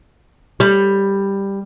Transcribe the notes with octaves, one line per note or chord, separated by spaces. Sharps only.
G3